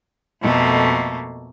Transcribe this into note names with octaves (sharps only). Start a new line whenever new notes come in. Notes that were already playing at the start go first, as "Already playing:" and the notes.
F2 B2 A3 A#3